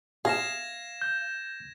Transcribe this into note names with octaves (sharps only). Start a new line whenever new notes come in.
G#4 F5 G#6 A#6 E7
G6